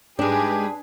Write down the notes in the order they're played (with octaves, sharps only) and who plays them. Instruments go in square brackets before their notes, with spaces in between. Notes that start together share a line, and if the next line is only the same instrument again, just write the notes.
[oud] G#2 G#3 [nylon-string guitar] D4 [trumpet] G4 [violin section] G#4 B4 G#5